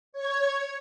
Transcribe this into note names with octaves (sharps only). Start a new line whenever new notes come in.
C#5 G#6